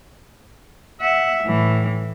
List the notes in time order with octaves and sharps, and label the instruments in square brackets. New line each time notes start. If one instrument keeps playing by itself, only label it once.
[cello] E5 F#5
A2 E3